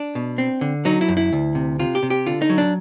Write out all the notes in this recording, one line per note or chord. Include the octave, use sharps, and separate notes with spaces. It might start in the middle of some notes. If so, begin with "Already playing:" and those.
Already playing: D4
B2
C4
D3
F#3 D#4
E4
F#2
E4
D2
C3
C3 F4
G4
C3
G4
D3 F4
D#4
F#3
D4